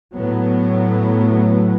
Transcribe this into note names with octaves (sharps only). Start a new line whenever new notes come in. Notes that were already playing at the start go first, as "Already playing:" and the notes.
A2 F#3 B3